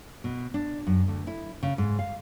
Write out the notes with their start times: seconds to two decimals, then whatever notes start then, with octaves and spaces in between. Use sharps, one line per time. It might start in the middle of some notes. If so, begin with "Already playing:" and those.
0.24 B2
0.54 D4
0.87 F#2
1.08 D2
1.27 E4
1.63 C#3
1.78 G#2
1.99 F5